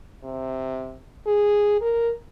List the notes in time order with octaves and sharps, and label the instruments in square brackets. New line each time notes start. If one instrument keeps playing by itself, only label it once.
[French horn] C3
G#4
A#4